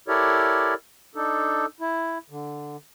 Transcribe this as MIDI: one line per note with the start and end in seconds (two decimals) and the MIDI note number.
0.08 0.74 64
0.08 0.74 67
0.08 0.74 69
0.08 0.74 70
0.08 0.74 73
0.08 0.74 74
1.15 1.66 62
1.15 1.66 63
1.15 1.66 69
1.81 2.18 64
2.30 2.77 50